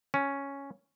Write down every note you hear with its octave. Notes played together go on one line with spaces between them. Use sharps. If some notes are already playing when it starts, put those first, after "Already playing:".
C#4